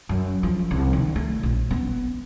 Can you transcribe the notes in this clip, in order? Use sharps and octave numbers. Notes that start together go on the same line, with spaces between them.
F#2
F3
C2
D#3
A3
A#1
B3